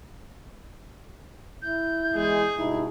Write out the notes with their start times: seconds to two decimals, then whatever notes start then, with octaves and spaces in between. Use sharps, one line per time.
1.62 E4 G6
2.15 E2 G#3 G#4
2.58 G2 B2 D#4 E4